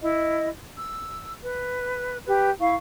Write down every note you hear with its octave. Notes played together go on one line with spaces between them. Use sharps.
E4 D#5
E6
B4
G4 B4
E4 F5 C#6